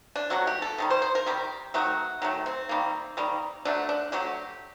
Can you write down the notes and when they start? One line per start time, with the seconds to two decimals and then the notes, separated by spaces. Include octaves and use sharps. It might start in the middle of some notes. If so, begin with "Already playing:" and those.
0.16 D4
0.30 C3 F#3 A3 F#4
0.47 G4
0.62 A4
0.78 C3 D#3 G3
0.90 C5
1.02 C5
1.15 A#4
1.26 C3 D#3 G3 G4
1.74 D#3 F#3 A3 F#4
2.22 D#3 F#3 A3
2.46 C4
2.69 D#3 G3 A#3
3.17 D#3 G3 A#3
3.65 D3 F#3 A3 D4
3.89 D4
4.12 D3 F#3 A3 G4